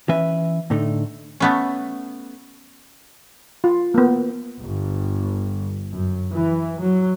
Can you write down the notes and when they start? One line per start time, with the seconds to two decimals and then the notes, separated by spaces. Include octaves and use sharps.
0.09 E3 C#4 B4 E5
0.70 A2 D3 A3 D#4
1.40 A3 B3 C#4
3.64 F4
3.94 A#3 B3
4.60 G1
5.92 F#2
6.32 E3
6.81 F#3